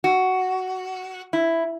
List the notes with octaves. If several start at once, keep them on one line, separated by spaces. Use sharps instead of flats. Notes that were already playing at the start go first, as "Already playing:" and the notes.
F#4
E4